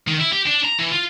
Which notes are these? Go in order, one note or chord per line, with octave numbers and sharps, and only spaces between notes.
D#3
E4
G4
D4
A#5
E3
F4